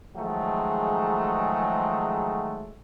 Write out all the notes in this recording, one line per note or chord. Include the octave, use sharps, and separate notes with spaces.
D#3 F3 F#3 G#3 A3 G#4